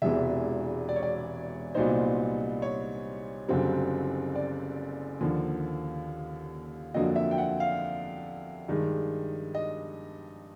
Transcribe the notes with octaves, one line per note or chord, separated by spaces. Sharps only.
E1 E2 C3 E3 G#3 E5
D5
C#5
D5
C2 A#2 F#3 B3 D#4 C5
C#5
F#1 F#2 D3 G3 C4
D5
D#2 D3 F3 A#3
F2 D3 F#3 A#3 D4 D#5
E5
G5
F#5
F5
G2 D#3 G#3
D#5